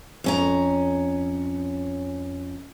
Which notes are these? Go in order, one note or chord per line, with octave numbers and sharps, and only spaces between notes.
F2 C#4 A#5